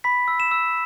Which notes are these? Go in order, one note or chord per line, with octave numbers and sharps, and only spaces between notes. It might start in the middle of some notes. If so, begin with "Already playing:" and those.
B5 B6
E6
E7
E6